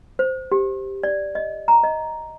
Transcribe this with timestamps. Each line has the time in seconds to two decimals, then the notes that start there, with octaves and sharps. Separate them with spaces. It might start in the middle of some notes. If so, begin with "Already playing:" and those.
0.19 C5
0.52 G4
1.03 D5
1.35 D#5
1.68 A#5
1.84 D#5